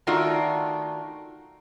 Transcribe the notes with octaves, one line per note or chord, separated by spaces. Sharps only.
D#3 A3 D4 D#4 F4 F#4